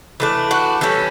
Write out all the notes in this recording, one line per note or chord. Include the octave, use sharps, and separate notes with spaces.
E3 A3 D4
F#4
E3 G3 C#4 A4